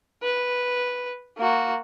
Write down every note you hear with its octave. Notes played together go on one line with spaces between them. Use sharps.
B4
A#3 F#4